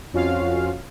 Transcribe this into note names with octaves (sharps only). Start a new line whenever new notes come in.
F2 C#4 F4 F#4 F5